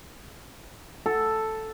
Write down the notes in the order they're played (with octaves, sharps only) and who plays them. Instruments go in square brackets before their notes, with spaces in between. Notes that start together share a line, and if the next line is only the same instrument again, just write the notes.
[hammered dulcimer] A4